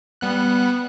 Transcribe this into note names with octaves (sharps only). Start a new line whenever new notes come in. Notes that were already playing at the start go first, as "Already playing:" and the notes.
G3 B3 F#6